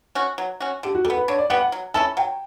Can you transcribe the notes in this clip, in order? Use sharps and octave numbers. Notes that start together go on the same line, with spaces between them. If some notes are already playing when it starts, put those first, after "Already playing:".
C#4 F#4
F#3
C#4 F#4
D3 G4
F#4
G3 A4
B3
B4
D3 C#5
D5
G3 B3 F#5
F#5
F#3
C#4 E4 A4 A5
F#3 G5